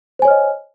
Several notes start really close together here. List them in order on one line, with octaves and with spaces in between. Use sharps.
C5 G#5 C#5 F6 D#5